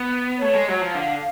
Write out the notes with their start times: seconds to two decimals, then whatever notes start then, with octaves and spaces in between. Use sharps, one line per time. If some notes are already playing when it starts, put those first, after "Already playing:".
Already playing: B3
0.38 A3 C#5
0.55 G#3
0.68 F#3
0.81 F3
0.94 D3 F5